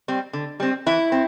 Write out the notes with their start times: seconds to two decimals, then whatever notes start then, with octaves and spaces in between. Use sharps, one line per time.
0.08 G3 C4
0.33 D3
0.60 G3 C4
0.86 E3 E4
1.12 C4